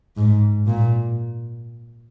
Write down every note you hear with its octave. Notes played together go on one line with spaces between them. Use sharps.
G#2
A#2